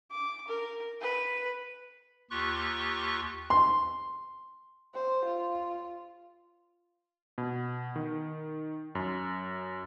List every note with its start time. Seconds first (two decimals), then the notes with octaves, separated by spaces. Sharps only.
0.11 D6
0.48 A#4
1.01 B4
2.31 D#2 F4 G4 C#6 F#6
3.50 C6
4.94 C5
5.25 F4
7.38 B2
7.96 D#3
8.95 F#2